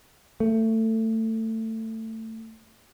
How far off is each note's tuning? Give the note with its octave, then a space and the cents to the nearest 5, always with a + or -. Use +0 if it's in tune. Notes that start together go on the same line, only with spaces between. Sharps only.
A3 +20